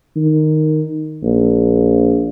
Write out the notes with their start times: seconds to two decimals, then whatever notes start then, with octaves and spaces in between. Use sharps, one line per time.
0.16 D#3
1.23 A#1